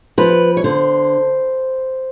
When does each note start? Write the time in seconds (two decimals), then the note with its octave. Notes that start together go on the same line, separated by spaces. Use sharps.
0.18 F3 B4
0.57 C#5
0.64 D3 C5